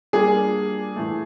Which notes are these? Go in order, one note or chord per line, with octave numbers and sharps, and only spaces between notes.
G3 A#3 D4 F4 G#4
A2 E3 A3